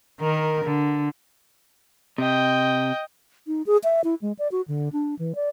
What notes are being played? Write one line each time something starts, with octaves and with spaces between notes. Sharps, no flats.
D#3 A#4
D3
C3 D#5 G5
D#4
G#4
E5
E4
G#3
D5
F#4
D3
D4
E3
D5